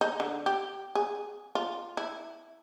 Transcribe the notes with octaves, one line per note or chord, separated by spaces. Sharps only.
D#4
D3
G4
G#4
F4
E4